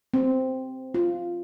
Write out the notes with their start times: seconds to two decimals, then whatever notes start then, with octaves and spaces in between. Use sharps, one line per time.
0.14 C4
0.94 F4